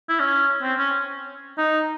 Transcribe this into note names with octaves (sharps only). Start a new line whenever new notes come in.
E4
C#4
C4
C#4
D#4